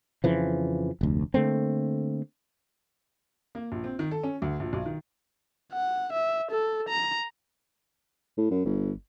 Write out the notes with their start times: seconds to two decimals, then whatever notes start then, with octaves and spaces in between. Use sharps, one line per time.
0.24 F2 C#3 E3 F3
1.01 F1 D2
1.34 D3 A3 A#3 C4
3.55 A#3
3.72 A#1
3.84 C4
3.99 D#3
4.11 A4
4.24 C#4
4.42 D2
4.60 A#1
4.73 B1
4.86 D#3
5.73 F#5
6.13 E5
6.52 A4
6.89 A#5
8.37 A2
8.51 F#2
8.65 G1